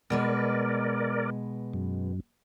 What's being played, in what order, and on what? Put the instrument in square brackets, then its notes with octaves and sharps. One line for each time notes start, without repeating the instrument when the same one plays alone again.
[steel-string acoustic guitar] B2 G#3 B4 [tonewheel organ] A#4 D5
[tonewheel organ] F#2